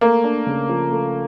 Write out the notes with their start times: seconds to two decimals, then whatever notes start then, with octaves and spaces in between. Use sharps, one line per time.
0.01 A3 A#3
0.24 D4
0.47 C#3
0.69 F3
0.91 A3